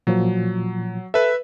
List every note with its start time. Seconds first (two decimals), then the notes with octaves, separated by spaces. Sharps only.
0.07 A#2 F3 F#3
1.14 A4 B4 E5